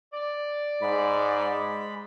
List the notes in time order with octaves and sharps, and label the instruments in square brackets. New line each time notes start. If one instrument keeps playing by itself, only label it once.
[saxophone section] D5
[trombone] G#2 [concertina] G#3 B5